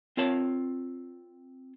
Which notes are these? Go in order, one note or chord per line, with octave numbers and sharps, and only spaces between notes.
C4 F4 A#4 C#5 A5